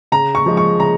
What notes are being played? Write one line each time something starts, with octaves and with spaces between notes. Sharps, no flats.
C#3 A#5
C#6
F3 G#3
C#6
C#3 A#5